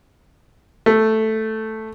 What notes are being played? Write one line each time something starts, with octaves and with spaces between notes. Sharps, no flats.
A3